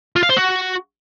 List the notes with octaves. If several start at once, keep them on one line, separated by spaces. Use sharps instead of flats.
F4
F5
C5
F#4